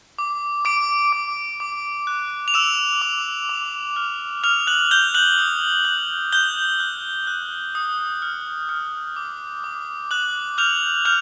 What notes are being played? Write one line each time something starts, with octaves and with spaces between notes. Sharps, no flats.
D6
D6 D7
D6
D6
F#6
F7
D6 E6 E7
D6
D6
F6
D#6 F6 F7
F#6 F#7
F#6 G6 G7
F#6 F#7
D#6
F#6
F#6 G6 G7
F#6
F#6
D#6
F6
F6
D6
D6
D6 F#6 F#7
F6 G6 F7
F6 G6 F7